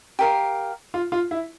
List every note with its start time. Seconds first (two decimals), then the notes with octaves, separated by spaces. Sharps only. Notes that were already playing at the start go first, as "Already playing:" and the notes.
0.19 G4 A#4 F5
0.94 F4
1.12 F4
1.31 E4